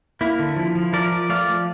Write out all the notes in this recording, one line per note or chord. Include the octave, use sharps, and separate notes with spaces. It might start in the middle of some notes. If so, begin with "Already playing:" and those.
A#3 E4
D3
F3
F3
F3 A#4 D5
F3
A3 D5 F5
F3